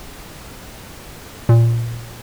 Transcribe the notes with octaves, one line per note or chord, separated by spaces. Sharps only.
A#2